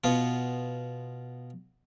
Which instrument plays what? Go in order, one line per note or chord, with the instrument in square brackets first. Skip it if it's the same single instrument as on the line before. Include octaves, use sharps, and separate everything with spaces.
[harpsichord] B2 B3 F4